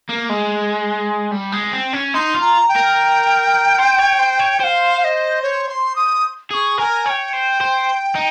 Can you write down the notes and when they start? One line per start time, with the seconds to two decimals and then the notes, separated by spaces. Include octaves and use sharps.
0.09 A#3
0.30 G#3
1.32 G3
1.53 G#3
1.73 C4
1.93 C#4
2.14 D#4 C6
2.34 F4
2.41 A#5
2.69 G5
2.76 A#4
3.78 C5
3.99 C#5
4.19 C5
4.39 C#5
4.60 C5 F5 G5
5.00 F5
5.04 D#5
5.42 C#5
5.69 C6
5.96 D#6
6.51 G#4 C#6 D#6
6.78 A#4 G#5
7.06 C#5 G#5
7.10 G5
7.33 C5
7.61 C5
8.15 D#4